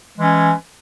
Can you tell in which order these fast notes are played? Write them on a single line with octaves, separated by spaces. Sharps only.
G#3 E3 C#4